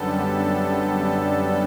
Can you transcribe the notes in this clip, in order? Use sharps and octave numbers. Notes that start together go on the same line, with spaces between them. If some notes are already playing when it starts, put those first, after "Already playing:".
Already playing: F#2 D3 G3 B3 A4